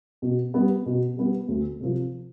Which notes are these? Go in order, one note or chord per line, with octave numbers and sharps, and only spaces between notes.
B2
G3 B3
B2
G3 B3
D2
C3 F3